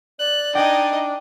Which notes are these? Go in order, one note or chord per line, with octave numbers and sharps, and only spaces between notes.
D5 F#6
D4 D#4 D#5 G5 G#5